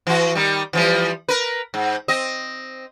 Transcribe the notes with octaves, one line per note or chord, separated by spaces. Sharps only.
E3 F#4
D#3 G3
E3 F3 G3
A#4 B4
G#2
C4 D#5